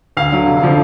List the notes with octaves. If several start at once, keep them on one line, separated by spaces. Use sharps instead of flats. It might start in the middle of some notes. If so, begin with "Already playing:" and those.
D2 F5
D3 F#3
F1
D3 F3